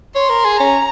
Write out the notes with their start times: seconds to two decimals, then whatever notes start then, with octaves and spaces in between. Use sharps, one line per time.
0.15 C#5 C6
0.30 A#4
0.45 G#4
0.59 C#4 A#5